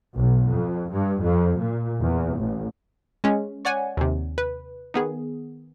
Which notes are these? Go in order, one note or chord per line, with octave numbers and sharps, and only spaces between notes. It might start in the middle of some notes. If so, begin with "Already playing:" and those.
B1
F2
G2
F2
A#2
E2
A1
G#3 C#4
C#5 D5 F#5 G#5
D#2 C3
B4
D#3 B3 G#4